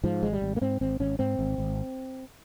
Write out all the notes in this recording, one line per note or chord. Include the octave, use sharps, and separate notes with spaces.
G#2 F3
G#1 G#3
G3
G#1
A#3
G#2 C4
G#1 C4
G#1 C#4
G#2 C4
G#1
G#1